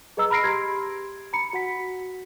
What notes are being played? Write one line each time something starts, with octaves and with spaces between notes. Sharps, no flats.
G#4 B4 D#5 A#5 E6
A#5 B5 F6 A#6 C7 D7
G4 C6 G#6
A#5 B5 C#7
F#4 F#5 B6